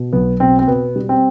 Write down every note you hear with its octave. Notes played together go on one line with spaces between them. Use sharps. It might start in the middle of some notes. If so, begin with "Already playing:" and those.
Already playing: B2
B1 B3
B2 C4
C4
B2 B3
G3
C4